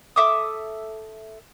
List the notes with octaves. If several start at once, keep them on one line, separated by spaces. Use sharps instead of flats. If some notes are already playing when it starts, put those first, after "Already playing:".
A4 E5 D6 D#6